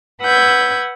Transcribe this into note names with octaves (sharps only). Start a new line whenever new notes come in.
B4 F#5 E6 G6 G#6